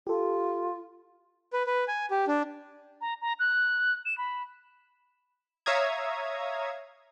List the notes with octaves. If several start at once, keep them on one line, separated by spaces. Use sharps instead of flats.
F4 G4 A4
B4
B4
G#5
G4
D4
A#5
A#5
F#6
E7
B5
C#5 E5 F5 A#5 D#6 G#6